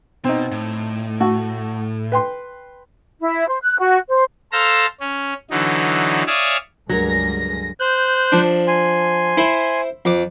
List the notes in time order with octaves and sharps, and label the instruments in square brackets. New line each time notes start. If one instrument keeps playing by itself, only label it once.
[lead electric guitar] B2 [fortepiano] C4 D#4
[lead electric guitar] A2
[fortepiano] A3 F#4
B4 G5 C6
[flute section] E4
C5
F#6
F#4
C5
[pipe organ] A4 C5 F5 A#5 E6
C#4
D3 E3 F#3 D#4
C#5 D5 E5 F5 G#5 D#6
[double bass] C#2 G2 [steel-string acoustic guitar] D3 G#4 A#4 [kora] F#3 [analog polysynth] A#6
[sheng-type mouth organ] C5 F#6 G6
[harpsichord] F3 D4
[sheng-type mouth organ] G#5 C6
[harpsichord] E4 C5
F2 D6